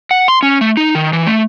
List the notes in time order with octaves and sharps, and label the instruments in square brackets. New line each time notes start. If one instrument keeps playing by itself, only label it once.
[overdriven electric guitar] F#5
C6
C#4
A3
D#4
D#3
E3
A3